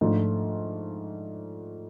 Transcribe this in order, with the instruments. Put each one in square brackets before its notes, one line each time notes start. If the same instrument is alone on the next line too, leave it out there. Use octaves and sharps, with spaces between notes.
[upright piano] G#2 F3 A3 D4 F4